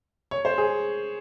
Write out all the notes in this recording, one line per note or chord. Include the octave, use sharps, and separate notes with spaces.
C#5
C5
G#4